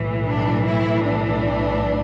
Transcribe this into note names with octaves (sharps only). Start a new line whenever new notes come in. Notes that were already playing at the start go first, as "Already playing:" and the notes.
Already playing: B1 A2 E3
D4
E4
D4